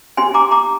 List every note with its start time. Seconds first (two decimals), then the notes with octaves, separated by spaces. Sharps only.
0.17 D4 G4 C5 G#5 C6
0.34 A#5 D6
0.51 A#5 D6